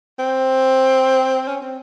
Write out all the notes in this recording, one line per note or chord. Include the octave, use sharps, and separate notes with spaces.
C4
C#4
C4